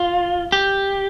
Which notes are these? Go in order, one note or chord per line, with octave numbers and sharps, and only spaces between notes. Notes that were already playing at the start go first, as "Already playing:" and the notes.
Already playing: F4
G4